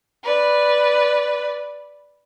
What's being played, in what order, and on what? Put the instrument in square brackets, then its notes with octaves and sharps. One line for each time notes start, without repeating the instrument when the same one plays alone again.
[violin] B4 D5